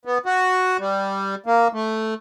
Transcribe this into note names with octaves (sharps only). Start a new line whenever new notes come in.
B3
F#4
G3
A#3
A3